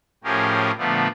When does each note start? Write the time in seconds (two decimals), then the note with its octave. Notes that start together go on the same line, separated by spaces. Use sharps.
0.24 A2 F3 C#4 G4 G#4 A#4
0.77 A#2 D3 F3 A3 B3